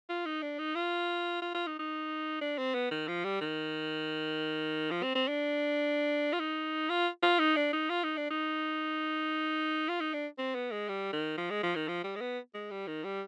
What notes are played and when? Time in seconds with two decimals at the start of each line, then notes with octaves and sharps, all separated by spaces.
0.09 F4
0.26 D#4
0.42 D4
0.59 D#4
0.75 F4
1.42 F4
1.54 F4
1.67 D#4
1.79 D#4
2.41 D4
2.58 C4
2.74 B3
2.91 D#3
3.08 F3
3.24 G3
3.41 D#3
4.91 F3
5.03 C4
5.15 C4
5.28 D4
6.33 F4
6.40 D#4
6.90 F4
7.23 F4
7.39 D#4
7.56 D4
7.73 D#4
7.90 F4
8.03 D#4
8.17 D4
8.30 D#4
9.88 F4
10.00 D#4
10.13 D4
10.38 C4
10.55 B3
10.71 G#3
10.89 G3
11.13 D#3
11.38 F3
11.50 G#3
11.63 F3
11.75 D#3
11.88 F3
12.04 G3
12.15 G#3
12.21 B3
12.54 G#3
12.71 G3
12.87 D#3
13.04 G3